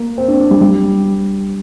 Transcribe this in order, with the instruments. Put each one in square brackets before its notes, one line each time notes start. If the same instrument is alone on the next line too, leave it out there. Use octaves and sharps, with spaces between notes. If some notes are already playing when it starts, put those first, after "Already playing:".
Already playing: [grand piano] A#3
C4
D4
D4
G3
G3